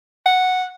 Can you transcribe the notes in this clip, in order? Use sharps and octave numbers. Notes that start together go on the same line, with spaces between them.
F#5